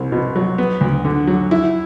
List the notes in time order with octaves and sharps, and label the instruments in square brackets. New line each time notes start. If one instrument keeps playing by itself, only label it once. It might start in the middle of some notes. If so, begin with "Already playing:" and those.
Already playing: [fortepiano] C2 C4
B2
F#3
B3
D2
D3
F#3
E4